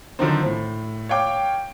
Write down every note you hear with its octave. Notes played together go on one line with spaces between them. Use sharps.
D3 D#3 F3 F#3 C4
A2
C#5 F5 G5 D6